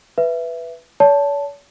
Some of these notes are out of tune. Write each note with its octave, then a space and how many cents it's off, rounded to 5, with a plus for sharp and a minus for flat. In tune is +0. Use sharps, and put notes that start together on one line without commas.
B4 +0 E5 +15
C#5 +45 A5 +0